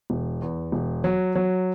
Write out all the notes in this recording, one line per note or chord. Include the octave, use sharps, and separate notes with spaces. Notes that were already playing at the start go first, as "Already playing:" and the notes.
E1
E2
E1
F#3
F#3